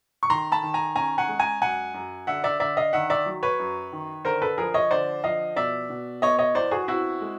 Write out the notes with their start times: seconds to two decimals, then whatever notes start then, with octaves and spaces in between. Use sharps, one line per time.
0.23 C#6
0.30 D#3 A#5 C6
0.52 A5 B5
0.63 D#3
0.74 G#5 A#5
0.96 C#4 G#5 A#5
1.18 F#5 G#5
1.28 G#3
1.39 G#5 A#5
1.62 F#2 F#5 G#5
1.94 F#2
2.27 D3 E5 F#5
2.44 D5 E5
2.60 D3 D5 E5
2.77 D#5 F5
2.93 D#3 E5 F#5
3.10 D5 E5
3.26 F#3
3.43 B4 C#5
3.59 F#2
3.92 D#3
4.24 D3 A#4 C5
4.42 A4 B4
4.58 F3 G#4 A#4
4.74 C#5 D#5
4.91 D3 C5 D5
5.23 F3 D#5 F5
5.56 B2 D5 E5
5.90 B2
6.22 B3 C#5 D#5
6.39 C#5 D#5
6.55 E2 C5 D5
6.71 F#4 G#4
6.88 C4 E4 F#4
7.21 G#3